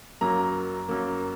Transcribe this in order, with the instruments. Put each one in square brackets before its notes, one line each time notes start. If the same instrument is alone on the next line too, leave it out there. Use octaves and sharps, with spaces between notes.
[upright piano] F#2 F#3 A#3 A#5
F#2 F#3 A#3